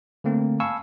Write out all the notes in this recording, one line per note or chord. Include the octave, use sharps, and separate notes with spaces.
D3 A3 A#3 C4
F5 G#5 A5 B5 C#6 E6